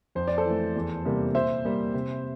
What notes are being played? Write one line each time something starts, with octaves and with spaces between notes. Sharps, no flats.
F2 C5
D5
A4 C5
E3 A3
E2
C3 G3 A#3
A#2 C5 E5
G3 A#3
C3